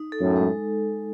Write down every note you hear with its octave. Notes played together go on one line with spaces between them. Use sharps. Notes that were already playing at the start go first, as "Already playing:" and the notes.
Already playing: D#4
A4
F#2 A2
G#3